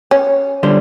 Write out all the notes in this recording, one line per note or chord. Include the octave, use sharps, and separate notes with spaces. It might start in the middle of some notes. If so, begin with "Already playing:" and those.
C#4
D3 G3 C5